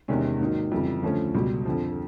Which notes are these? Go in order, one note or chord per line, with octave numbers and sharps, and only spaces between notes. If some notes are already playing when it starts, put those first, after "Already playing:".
E2 C3 D#3 G#3 C#4
G#2 D#3 F#3 A#3 D#4
F2 C#3 E3 G3
D2 D3 F3 A3 C#4
C#2 B2 G3
F2 D3 F3